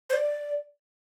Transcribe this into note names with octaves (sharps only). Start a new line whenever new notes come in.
C5
D5